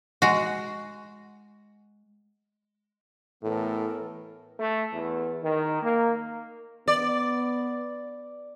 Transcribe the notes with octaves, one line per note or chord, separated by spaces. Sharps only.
G#3 F#4
A2 E3 B3 A4 A#4
A3
E2
D#3
A#3
B3 D5